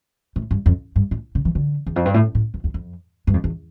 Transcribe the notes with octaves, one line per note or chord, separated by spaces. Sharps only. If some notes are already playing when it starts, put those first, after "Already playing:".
A2
G2
F2
G2
A2
C#3
E3
D3
E2
F2
G2
A2
A2
F2
E2
F2
G2
F2
E2